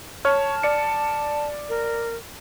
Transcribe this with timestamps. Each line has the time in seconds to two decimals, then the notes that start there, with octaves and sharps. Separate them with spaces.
0.25 C#5 A5 F6
0.63 D5 C#7
1.69 A#4